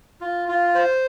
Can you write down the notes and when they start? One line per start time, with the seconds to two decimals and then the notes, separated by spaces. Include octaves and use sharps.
0.21 F4
0.49 F4
0.75 C5